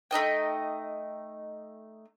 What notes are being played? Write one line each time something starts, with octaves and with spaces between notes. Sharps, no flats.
A3 D#4 D#5 G5